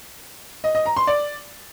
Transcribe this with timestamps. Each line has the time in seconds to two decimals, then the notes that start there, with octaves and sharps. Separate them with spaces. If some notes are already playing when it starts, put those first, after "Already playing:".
0.64 D#5
0.75 D#5
0.86 A#5
0.97 C6
1.07 D5